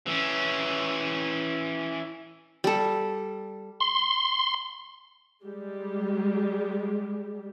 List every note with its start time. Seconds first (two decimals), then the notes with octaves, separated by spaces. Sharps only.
0.06 E3 C#4
2.64 G3 A4
3.80 C6
5.43 G3 G#3 G4